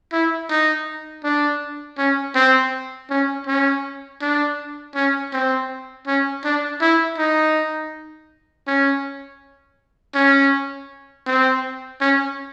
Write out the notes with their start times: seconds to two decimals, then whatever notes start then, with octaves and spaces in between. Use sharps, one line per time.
0.13 E4
0.50 D#4
1.24 D4
1.98 C#4
2.35 C4
3.10 C#4
3.47 C#4
4.21 D4
4.95 C#4
5.33 C4
6.07 C#4
6.44 D4
6.81 E4
7.18 D#4
8.67 C#4
10.15 C#4
11.26 C4
12.01 C#4